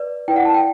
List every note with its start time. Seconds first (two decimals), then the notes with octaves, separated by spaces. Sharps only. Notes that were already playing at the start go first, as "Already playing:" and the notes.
Already playing: B4 D5
0.28 E4 B4 D5 G5
0.36 F#5
0.45 A5
0.54 G5